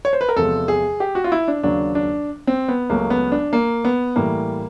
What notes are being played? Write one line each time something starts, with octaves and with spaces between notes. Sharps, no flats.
C#5
C5
B4
A#4
E2 C3 F3 G#3 A4
G#4
G4
F#4
F4
E4
D4
D#2 C#3 F#3 D4
D4
C4
B3
C#2 C#3 F#3 A3 A#3
B3
D4
A#3
B3
A2 E3 G3 A#3